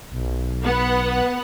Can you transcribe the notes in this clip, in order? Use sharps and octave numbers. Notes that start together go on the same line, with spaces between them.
B1
B3 F#5